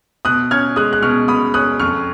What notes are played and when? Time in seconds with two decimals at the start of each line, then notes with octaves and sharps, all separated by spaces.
0.25 B2 D#6 F#6
0.51 C#4 F6 G#6
0.76 G#3 D#6 F#6
0.93 F#6
1.02 B2 C#6 F6
1.28 B2 B5 D#6
1.54 C#4 D#6 F#6
1.80 F2 C#6 F6